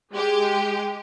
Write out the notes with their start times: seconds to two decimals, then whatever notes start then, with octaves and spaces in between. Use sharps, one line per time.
0.14 G#3 G4